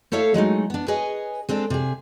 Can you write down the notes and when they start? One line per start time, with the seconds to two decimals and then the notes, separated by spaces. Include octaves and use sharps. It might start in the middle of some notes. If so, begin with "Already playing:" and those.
0.12 A3 E4 A4 C#5 E5 F5
0.34 F#3 G#3 A3 D#4
0.70 B3 D4
0.88 G#4 B4 C#5 D#5 G#5
1.49 G#3 C4 D4 A4
1.70 C3 G#4